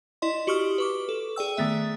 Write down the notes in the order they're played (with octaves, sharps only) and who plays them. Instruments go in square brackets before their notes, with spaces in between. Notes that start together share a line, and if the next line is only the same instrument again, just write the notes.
[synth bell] E4 D5 D#5 C6
F#4 G4 C#6 D#6 F6
B4 C#6 D6
A4
G#4 D5 G5 E6
D#3 A3 B3 E5